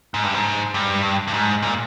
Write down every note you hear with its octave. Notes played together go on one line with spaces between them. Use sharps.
G#2
G2
G#2
G2
G2
G#2
A#2